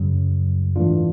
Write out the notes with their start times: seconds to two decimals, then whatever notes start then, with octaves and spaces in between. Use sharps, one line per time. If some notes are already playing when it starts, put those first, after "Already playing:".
Already playing: F#2 C#3 F#3
0.76 G#2 E3 A3 D4 F4